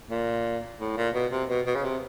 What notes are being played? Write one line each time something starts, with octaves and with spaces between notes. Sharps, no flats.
A#2
A2
A#2
B2
C3
B2
B2
C#3
C3